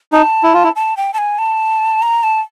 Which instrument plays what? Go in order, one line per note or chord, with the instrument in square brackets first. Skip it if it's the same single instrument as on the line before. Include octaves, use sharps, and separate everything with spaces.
[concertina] D#4 [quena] A5
[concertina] E4
F4
E4
[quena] A5
G5
A5
G#5
A5
A#5
A5